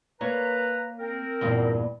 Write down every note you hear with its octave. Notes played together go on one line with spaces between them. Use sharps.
A#3 B4 C#5 A#5
C4 A#4
E2 G2 A#2